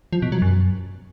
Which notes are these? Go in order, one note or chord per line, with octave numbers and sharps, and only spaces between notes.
F3
B2
F#3
F#2